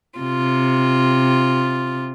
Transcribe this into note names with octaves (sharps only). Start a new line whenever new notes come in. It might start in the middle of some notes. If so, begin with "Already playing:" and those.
C3 F4